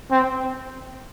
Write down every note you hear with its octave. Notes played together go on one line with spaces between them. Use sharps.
C4